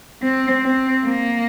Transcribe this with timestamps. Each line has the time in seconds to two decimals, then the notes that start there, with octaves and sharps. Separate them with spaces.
0.22 C4
0.63 C4
1.05 A#3